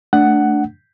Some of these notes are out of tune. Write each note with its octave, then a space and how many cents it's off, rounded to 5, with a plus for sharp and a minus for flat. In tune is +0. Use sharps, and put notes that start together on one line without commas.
A3 +0 D4 +0 F#5 +10